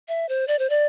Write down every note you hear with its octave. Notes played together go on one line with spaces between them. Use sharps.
E5
C5
D5
C5
D5